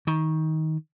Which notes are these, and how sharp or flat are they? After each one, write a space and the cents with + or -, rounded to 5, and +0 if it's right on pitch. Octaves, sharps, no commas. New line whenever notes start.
D#3 +20